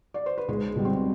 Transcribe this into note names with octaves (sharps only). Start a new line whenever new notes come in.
D5
C5
B4
B1 G#3 G#4
B2 G3
C4 C5